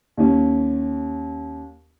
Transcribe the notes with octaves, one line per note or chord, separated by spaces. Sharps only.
D#2 C#4